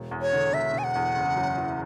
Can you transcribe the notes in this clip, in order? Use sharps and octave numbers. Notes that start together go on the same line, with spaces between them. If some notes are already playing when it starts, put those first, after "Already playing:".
Already playing: E1
E2
C#5
D3
E1 E5
E1 G#5
F#5
E2
F#1
F#2
E3